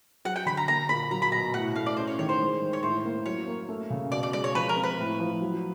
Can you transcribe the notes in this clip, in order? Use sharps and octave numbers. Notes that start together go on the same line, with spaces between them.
F#3 F#5
G5
D3 B5
A#5
A#3 A#5
A#2 B5
F#3 A#5
B5
B2 A#5
A2 F#5
A3 F5
D5
C#4 C5
C#5
D#3 C#5
C5
G#3
D#3
C#5
A2 C5
A#3
F#3 C#5
A#3
A3
C#3
B2 D5
D5
G#3 D5
C#5
F3 B4
A#4
C4
B4
A2
F3
F#3